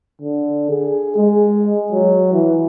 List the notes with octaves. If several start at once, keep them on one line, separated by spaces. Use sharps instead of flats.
D3
G#4
G#3
F#3
E3